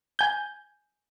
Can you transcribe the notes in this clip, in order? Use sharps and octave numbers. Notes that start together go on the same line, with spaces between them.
G#5 G6